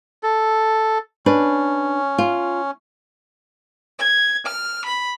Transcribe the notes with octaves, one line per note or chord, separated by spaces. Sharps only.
A4
C#4 D4 B4
F4
G#6
F6
B5